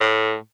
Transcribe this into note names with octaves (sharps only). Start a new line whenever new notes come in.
A2